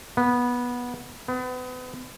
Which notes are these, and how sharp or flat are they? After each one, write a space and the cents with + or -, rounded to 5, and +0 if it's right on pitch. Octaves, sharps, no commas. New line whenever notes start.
B3 -15
B3 +35